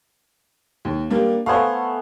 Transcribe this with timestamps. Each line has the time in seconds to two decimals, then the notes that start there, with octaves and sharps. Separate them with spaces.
0.85 D#2
1.10 G3 A#3 D4
1.46 A3 B3 C5 F5 G#5